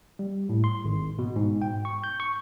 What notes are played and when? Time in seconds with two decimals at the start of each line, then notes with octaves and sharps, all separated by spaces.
0.19 G3
0.49 A2
0.64 C6
0.85 G#1
1.19 B2
1.36 G#2
1.62 G5
1.85 C#6
2.04 G6
2.20 C#6